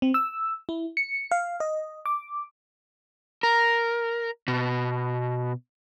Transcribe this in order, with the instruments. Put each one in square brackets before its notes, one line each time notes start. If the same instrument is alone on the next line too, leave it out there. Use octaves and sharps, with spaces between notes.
[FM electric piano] C4
E6
E4
C#7
F5
D#5
D6
[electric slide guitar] A#4
B2